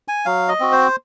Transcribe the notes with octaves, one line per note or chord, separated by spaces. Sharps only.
G#5
F#3 F5
D#5
C4 F#4
C5